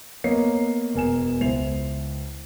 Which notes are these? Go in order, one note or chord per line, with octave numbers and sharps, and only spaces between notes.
A#3 B3 C#5 D#5 C7
E1 A#4 G#5 E7
C#2 E4 C5 C7 F7